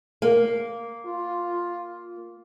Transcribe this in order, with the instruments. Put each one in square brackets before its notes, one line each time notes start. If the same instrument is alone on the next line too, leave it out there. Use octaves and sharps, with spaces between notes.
[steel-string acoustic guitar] A#3
[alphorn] F4